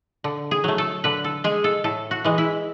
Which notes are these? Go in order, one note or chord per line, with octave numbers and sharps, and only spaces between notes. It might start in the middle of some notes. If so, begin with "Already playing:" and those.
D3
G#4
F#3 A3
A4
D3 B4
A4
G#3 G#4
A4
A2 A4
F#4
E3 G#3
E4